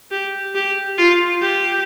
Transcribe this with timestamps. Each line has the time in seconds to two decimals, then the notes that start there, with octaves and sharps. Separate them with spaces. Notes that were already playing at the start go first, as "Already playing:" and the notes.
0.11 G4
0.54 G4
0.98 F4
1.41 G4